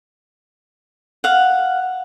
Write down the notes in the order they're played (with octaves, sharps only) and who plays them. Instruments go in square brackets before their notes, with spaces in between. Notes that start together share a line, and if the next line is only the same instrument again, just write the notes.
[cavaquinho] F5 F#5